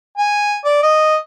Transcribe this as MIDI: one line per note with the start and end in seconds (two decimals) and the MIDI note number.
0.18 0.58 80
0.64 0.81 74
0.82 1.16 75